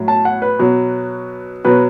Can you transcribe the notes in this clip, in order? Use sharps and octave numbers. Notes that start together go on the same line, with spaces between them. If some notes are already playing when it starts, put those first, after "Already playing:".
Already playing: A2 F#3
A5
F#5
B4
B2 F#3
B2 F#3 B4